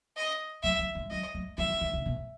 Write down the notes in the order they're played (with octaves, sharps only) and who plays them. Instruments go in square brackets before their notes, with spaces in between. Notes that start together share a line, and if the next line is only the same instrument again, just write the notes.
[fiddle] D#5
[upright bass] F#3 [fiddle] E5
[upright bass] F#3
G#3
[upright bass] F#3 [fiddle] D#5
[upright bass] F#3
[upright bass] F#3 [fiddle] E5
[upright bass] E3
D#3
C#3
B2